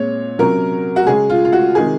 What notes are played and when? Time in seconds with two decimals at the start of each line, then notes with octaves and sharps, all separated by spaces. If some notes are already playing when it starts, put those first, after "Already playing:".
Already playing: A#2 G#3 C4 C#5
0.38 C3 F#3 C#4 A#4
0.96 F#4
1.07 C#3 G#3 C#4 G#4
1.30 F4
1.45 F4
1.52 F#4
1.75 C3 D#3 G#3 G#4